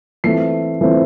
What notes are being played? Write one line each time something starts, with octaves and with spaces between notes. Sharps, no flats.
E3 A3 C4 C7
E3 A3 C4